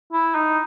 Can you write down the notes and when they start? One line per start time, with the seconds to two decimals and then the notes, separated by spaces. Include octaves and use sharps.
0.13 E4
0.35 D#4